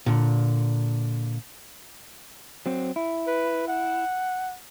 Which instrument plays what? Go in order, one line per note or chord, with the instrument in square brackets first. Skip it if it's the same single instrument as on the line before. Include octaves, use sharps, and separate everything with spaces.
[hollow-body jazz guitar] A#2 D3
[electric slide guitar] F#3 C4
E4
[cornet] B4
F#5